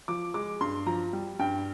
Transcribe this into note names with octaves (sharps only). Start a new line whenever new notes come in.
F3 D6
G#3 D6
G2 C6
F3 A#5
G3
G2 G5